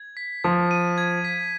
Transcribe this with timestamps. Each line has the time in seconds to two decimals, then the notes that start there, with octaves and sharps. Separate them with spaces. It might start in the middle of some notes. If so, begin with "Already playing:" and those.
Already playing: G#6
0.17 B6
0.44 F3 G#6
0.71 D#7
0.98 G#6
1.24 B6